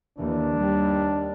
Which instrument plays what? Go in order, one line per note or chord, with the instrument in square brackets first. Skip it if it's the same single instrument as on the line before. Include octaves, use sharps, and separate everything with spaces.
[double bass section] D#2 E3 [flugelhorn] D4
[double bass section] D#2 G3